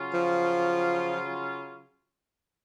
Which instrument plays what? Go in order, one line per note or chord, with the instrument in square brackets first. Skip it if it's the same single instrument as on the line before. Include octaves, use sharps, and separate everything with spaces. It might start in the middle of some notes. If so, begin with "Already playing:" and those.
Already playing: [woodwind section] C#3 F#3 C#4 F4
[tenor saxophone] F3